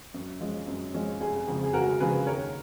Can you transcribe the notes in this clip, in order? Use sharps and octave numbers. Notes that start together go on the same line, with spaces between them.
F#2
F3 G#3 C#4
F#2
F3 G#3 C#4
F1 G#4
F2 C#3 F3
G#4
F1 F#4 A#4
F2 C#3 F3 G#4 B4
D#2 A#4 C#5